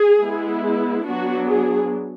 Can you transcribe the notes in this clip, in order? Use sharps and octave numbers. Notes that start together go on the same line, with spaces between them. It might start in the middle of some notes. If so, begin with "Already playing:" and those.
Already playing: G#4
G#3 B3 E4
F#3 B3 D4 F#4
G#4